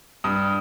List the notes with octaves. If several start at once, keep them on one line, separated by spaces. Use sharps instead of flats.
G2 D#6